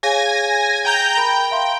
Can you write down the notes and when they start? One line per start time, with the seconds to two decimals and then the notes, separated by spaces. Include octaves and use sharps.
0.03 G#4 C#5 F5 G#5 G#6 A#6
0.85 G5 A#5 G6
1.17 A#4 G5 A#5 B5
1.51 E5 F5 C6